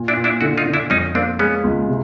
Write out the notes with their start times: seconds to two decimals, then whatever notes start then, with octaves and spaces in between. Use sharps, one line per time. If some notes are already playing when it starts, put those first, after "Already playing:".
Already playing: A#2
0.08 D4 E4
0.17 A#2
0.24 D4 E4
0.41 D3 E4 F#4
0.57 D#4 F4
0.66 D3
0.74 D4 E4
0.90 F2 C#4 D#4
1.15 A#3 C4 D4
1.39 G#3 B3 C#4
1.64 C#2
1.88 C3